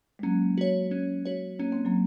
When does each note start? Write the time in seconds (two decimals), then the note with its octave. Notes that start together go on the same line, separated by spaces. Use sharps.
0.19 G#3
0.23 F#3 A#3 C#4
0.58 F#4 C#5
0.91 C#4
1.25 F#4 C#5
1.59 A#3 C#4
1.72 C4
1.85 F#3 A#3